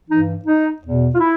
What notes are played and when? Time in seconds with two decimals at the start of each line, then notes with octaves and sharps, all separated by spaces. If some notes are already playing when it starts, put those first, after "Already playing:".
0.08 G2 E3 D#4
0.45 D#4
0.83 E2 B2
1.15 F4
1.19 E4